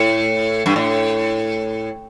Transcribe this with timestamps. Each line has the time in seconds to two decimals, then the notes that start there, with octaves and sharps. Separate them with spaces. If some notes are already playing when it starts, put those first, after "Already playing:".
Already playing: A2
0.66 G2
0.76 A2